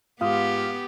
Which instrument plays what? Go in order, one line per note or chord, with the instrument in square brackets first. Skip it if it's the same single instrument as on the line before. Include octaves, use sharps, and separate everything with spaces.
[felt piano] G#2 F4 D#6 [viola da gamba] B3 G4 [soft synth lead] F5